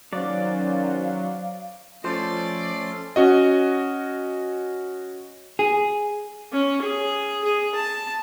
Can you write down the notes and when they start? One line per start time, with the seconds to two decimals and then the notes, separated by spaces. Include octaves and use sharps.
0.13 D#3 F#3 C#4 C5 D5 F5
2.04 F3 A3 C#4 C5 D5 C6
3.16 C#4 F#4 D#5
5.59 G#4
6.53 C#4
6.82 G#4
7.44 G#4
7.75 A5